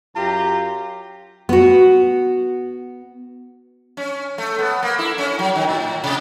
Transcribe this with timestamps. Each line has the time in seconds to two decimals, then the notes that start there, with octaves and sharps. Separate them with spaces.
0.15 F#2 F4 G4 A#5
1.49 B3 F#4
3.97 C#4
4.38 A3
4.59 B3
4.83 A#3
4.99 E4
5.18 C#4
5.39 F#3
5.55 D#3
5.69 A2
6.04 C3